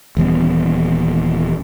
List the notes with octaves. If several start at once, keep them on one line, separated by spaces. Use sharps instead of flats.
D#1 E3 G3 B3